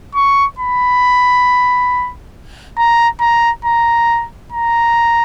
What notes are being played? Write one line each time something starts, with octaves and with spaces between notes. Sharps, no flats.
C#6
B5
A#5
A#5
A#5
A#5